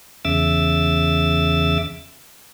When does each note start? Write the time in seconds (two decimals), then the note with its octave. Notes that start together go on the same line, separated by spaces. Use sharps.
0.25 E2 C#3 E5 D6 E6 A6